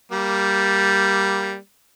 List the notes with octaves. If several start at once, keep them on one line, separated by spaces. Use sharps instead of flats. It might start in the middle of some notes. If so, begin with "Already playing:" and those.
G3 A#3